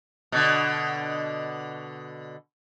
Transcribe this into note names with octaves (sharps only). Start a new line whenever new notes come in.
B2 D3